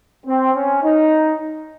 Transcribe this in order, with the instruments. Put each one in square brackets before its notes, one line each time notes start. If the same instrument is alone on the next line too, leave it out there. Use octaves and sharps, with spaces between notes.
[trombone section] C4
C#4
D#4